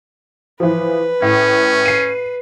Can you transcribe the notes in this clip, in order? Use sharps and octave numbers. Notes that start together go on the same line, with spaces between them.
E3 F3 B4
A2 C#4
C7 D#7